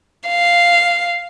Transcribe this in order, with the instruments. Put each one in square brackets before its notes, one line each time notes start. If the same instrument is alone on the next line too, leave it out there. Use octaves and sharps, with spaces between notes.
[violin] F5